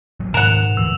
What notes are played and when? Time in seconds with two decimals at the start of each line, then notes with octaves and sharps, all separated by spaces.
0.20 A1 F#3
0.34 G#2 B2 D#3 G#3 A#4 F#5 E7 F7
0.77 G1 D2 A2 E3 E6